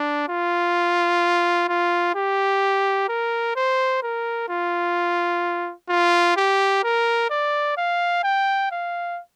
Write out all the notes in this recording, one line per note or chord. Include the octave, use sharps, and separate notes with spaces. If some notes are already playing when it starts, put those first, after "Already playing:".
Already playing: D4
F4
F4
G4
A#4
C5
A#4
F4
F4
G4
A#4
D5
F5
G5
F5